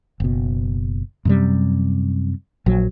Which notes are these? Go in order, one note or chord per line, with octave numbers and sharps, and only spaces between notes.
F#1 B2
F#2 C3 G3
A#1 F#3